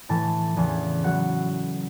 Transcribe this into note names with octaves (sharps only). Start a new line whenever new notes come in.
A2 E3 A5
E2 C#3 E3
A2 F#3 F#5